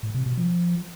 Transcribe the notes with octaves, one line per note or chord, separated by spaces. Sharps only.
A2
C3
B2
F3